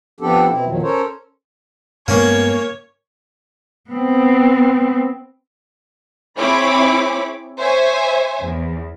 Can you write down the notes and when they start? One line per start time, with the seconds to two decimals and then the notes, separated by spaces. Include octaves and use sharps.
0.20 F3 B3 C4 D4 G4 A4
0.49 B2 C4 E4
0.65 E2 A#2 D#3 F3 F#3
0.82 C#4 A4 A#4 C5 C#5
2.08 G2 G#3 A#3 B3 C#4 C#5
3.91 B3 C4
6.39 C4 E4 G#4 C#5 B5 D6
7.59 C5 C#5 E5 G#5
8.41 E2